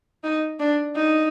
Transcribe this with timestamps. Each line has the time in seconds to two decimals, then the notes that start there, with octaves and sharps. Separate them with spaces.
0.24 D#4
0.59 D4
0.95 D#4